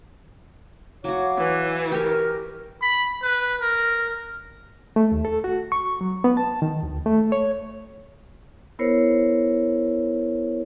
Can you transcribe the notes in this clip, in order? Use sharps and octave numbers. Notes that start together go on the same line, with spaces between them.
F#3 F#4 C#5 F5 D6
E3
G4 A#4 C#5
B5
B4
A#4
A3
D#2
A4
F#4
C#6
F#3
B3
A5
D#3
D2
A3
C#5
B3 E4 A#4 C5 C#5